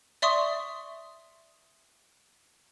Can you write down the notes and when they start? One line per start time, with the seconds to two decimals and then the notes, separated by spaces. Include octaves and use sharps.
0.22 D5 E5 C6 C#6 D#6